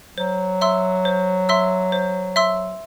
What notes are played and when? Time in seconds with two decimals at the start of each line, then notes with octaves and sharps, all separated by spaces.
0.18 F#3 C5
0.61 E5 C6 E6
1.05 C5
1.49 E5 C6 E6
1.92 C5
2.36 E5 C6 E6